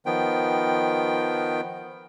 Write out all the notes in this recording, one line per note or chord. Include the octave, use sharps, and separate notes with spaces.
D#3 F3 B3 G5